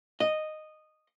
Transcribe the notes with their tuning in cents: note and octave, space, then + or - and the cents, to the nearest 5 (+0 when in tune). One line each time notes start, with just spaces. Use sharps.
D#5 -10